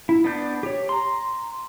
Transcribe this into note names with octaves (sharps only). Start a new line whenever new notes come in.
E4
B3 D4 G6
G4 C#5
A#5 C6